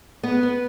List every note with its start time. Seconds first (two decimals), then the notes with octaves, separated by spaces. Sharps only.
0.23 B3 B4
0.43 B3